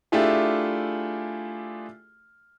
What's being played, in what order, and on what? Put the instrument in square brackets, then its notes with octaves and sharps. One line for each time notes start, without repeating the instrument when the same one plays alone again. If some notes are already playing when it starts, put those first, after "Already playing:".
[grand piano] A3 D4 E4 F4 G4 G#4